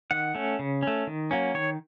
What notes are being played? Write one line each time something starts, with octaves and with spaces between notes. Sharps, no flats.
D#3 F#5
A3 C#4
C#3
A3 C#4
D#3
F#3 A#3 C#4
D#3 C#5